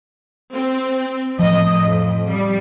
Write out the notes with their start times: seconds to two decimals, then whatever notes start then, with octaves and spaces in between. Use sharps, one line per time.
0.53 C4
1.39 A2 F3 D#5
1.86 F2
2.28 G3